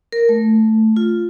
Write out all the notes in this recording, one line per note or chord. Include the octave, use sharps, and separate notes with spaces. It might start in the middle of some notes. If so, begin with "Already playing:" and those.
A#4
A3
F4